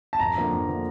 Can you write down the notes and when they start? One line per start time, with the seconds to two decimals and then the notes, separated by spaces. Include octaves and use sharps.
0.13 A5
0.19 F2 A#5
0.36 D3 F3 A#3
0.52 F2
0.68 D3 F3 A#3